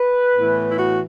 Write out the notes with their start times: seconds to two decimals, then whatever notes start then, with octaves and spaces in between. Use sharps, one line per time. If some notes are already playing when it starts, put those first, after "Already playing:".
Already playing: B4
0.36 A2 E3 B3 E4
0.69 E4
0.77 F#4